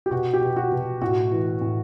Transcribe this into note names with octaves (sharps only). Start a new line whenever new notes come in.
G4
B2 F#4
G4
B2
F#4
B2
A2 F#4
E3
A2